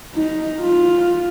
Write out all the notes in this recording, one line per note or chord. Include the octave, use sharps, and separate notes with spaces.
D#4
F4